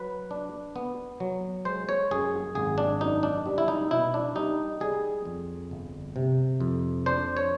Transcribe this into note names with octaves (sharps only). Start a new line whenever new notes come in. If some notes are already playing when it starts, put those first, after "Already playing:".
Already playing: F#3 B4
D4
B3
F#3
G#3 C5
C#5
F#2 G#4
G#1 G#4
D4
F#2 D#4
D4
G3
E4
D#4
B2 E4
D4
G3 D#4
G3 G#4
F2
G1
C3
F2
D4 C5
C#5